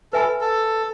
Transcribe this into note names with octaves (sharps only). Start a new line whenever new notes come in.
A4 B4 E5 G#5 B5
A4